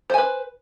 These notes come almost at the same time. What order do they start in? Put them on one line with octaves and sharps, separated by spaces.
C5 G#5 B4